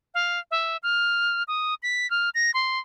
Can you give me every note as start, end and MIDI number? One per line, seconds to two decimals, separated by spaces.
0.14 0.39 77
0.51 0.77 76
0.83 1.43 89
1.48 1.74 87
1.83 2.09 95
2.10 2.30 89
2.35 2.51 94
2.54 2.79 84